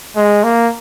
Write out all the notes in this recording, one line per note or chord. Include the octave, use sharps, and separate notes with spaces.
G#3
A#3